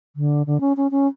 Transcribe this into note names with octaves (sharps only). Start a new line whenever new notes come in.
D3
D3
C#4
C#4
C#4